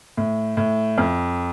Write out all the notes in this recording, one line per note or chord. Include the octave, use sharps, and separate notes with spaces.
A2
A2
F2